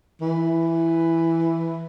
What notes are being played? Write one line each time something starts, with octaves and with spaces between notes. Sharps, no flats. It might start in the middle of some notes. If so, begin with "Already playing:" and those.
E3